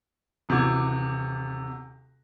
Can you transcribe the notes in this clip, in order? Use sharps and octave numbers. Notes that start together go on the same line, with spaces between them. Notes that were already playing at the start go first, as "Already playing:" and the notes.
D#1 C3 E3 F#4 D6 G#6